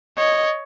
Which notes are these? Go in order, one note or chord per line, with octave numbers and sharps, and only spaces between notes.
C#5 D#5